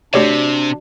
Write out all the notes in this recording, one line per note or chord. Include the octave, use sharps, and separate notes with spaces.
C3 A3 D4 F#4 G4 C#5 D5